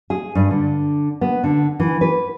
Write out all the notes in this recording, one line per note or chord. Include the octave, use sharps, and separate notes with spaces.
G#4
G2
D3
B3
D3
E3
B4